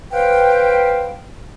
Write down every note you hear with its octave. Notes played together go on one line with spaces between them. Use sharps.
B4 C5 F5 G5